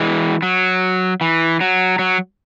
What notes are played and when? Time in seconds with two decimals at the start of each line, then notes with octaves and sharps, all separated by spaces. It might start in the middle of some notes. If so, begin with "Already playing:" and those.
Already playing: E3 G#3
0.42 F#3
1.21 E3
1.61 F#3
1.99 F#3